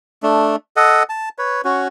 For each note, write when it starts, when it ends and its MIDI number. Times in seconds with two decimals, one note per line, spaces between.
0.23 0.56 57
0.23 0.56 62
0.76 1.03 69
0.76 1.03 75
0.76 1.03 78
1.09 1.29 81
1.38 1.61 71
1.38 1.61 73
1.65 1.88 61
1.65 1.88 66